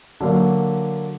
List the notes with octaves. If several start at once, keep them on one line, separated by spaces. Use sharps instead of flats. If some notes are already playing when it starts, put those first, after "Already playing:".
D3 F#3 A#3